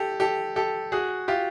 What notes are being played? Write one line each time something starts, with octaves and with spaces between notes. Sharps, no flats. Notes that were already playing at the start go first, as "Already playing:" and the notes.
Already playing: G4 A4
G4 A4
G4 A4
F#4 G#4
F4 G4